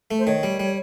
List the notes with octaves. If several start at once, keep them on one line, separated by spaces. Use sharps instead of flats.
A3
C5
D#3 C#5
G3
G3